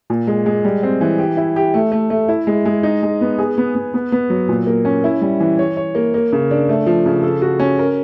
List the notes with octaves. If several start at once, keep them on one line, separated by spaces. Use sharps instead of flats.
A#2
G#3
G#3
G3
C4
E3
G4
E4
G4
A3
A3
A3
E4
G#3
G#3
D#4
G#3
B3
G#4
B3
B3
B3
B3
F#3
A#2
A#3
C#4
E4
G3
E3
C#5
C#5
A#3
A#3
C#3
D4
A3
F3
C#3
A4
F#4
C#4
A#4